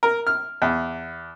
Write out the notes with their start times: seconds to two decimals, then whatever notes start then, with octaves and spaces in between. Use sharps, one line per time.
0.03 A#4
0.27 F6
0.62 E2